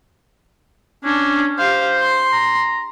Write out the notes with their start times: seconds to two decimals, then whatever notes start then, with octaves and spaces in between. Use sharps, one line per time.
1.04 C#4 D4
1.59 G4 C5 F5
1.99 C6
2.32 A#5